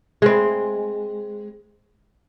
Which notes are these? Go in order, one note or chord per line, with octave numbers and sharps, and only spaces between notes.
G#3 C4